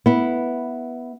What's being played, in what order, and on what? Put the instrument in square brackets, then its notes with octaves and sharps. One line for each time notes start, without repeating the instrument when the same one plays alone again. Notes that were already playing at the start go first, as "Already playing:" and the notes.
[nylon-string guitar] B3 E4